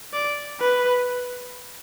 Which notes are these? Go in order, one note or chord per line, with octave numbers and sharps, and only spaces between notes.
D5
B4